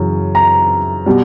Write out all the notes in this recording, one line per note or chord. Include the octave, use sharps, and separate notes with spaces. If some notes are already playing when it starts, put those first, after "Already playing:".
Already playing: F#2 C#3 E3
A#5
B2 G3